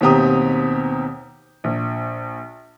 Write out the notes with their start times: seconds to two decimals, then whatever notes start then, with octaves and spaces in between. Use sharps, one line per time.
0.01 D#2 B2 C4 G4 A#5 D#6
1.64 A#1